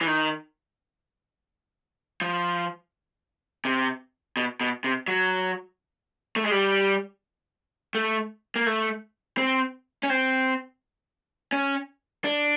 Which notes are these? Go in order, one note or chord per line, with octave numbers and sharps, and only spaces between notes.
E3
D#3
F3
C3
B2
B2
C3
F#3
A3
G#3
G3
A3
A#3
A3
C4
C#4
C4
C#4
D4